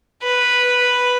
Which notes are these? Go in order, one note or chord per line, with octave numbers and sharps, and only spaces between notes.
B4